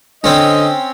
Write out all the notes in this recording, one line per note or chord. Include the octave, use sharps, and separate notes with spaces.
D3 C4 C#4 D#5